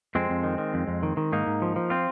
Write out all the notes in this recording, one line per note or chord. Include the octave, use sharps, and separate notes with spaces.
F2 G#3 C4
F2
D#3
D#3
F2
F2
D#3
D#3
G#2 A#3 D#4
G#2
F3
F3
C4 F4